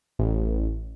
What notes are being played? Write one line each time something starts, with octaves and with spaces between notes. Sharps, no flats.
A1